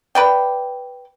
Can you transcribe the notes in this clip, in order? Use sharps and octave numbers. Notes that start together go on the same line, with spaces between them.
B4 D5 G5